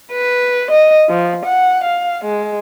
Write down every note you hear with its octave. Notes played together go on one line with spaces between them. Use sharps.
B4
D#5
F3
F#5
F5
G#3